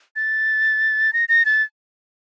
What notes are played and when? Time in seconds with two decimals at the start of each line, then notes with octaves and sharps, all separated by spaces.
0.16 A6
1.13 A#6
1.29 A#6
1.46 A6